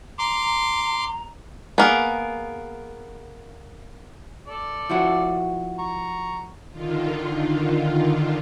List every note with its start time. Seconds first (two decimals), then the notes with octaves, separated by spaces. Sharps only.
0.19 A#5 C6 D6
1.78 A#3 B3 G#4
4.47 A4 D5
4.89 F3 E4 F#4
5.79 A#5 C#6
6.72 D3 D#3 F4